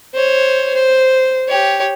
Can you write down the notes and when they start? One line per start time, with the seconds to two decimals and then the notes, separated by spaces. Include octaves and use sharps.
0.14 C5 C#5
0.74 C5
1.49 G4 C#5